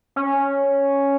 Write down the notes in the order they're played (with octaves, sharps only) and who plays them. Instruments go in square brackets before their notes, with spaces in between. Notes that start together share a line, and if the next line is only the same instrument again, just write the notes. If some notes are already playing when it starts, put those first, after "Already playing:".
[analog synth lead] C#4